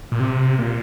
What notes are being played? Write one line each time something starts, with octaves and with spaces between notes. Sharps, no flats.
A#2
C3
A#2